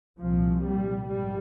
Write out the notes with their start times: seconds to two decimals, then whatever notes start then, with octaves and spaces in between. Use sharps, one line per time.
0.18 C2 A#2 F3
0.64 G3
1.08 A#1 G#2 G3